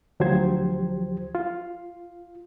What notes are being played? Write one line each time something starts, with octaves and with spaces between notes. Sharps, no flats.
D2 F3 F#3 G4 C5 G#6
F4